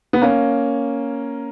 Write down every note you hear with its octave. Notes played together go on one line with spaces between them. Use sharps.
B3
A#3 C#4